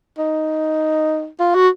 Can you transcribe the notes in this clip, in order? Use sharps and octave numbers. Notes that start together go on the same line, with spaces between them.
D#4
F4
F#4